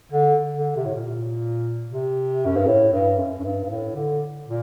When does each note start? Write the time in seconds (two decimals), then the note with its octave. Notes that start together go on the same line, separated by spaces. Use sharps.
0.12 D3
0.56 D3
0.76 C3
0.85 A2
0.94 A#2
1.91 C3
2.46 F#2
2.57 G2
2.67 A2
2.93 G2
3.19 F#2
3.39 F#2
3.44 G2
3.64 G2
3.69 A2
3.95 D3
4.46 A#2